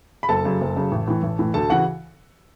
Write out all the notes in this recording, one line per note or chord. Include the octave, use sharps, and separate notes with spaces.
B5
F#1 A4 A5
F#2 C#3
F#1
F#2 C#3
A1
A2 E3
A1
A2 E3
D2 A4 A5
C#3 E3 F#4 F#5